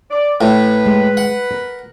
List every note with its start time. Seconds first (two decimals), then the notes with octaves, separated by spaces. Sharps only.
0.11 D5
0.41 A2 B4
0.86 G#3
1.17 F#5
1.51 A#4